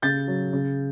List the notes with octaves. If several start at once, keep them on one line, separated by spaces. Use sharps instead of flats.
C#3 G6 A6
F#3
C#3